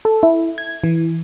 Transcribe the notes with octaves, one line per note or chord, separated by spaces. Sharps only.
A4
E4
G#6
E3